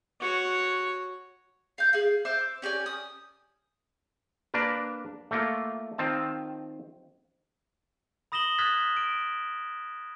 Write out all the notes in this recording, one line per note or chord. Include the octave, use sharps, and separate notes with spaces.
F#4 C#5
F5 G6
G#4 F5
C5 E5 D6
C#4 G4 D5 G#5
D#6
A#3 D4 A#4 B4
A3 A#3 F4
D#3 C4 F4 A5
B5 D#6 A#6 E7 F#7 G7
D#6 F6 F#6 G#6 A6 B6
D7